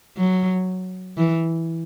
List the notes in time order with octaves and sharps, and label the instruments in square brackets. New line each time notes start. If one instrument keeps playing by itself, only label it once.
[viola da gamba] F#3
E3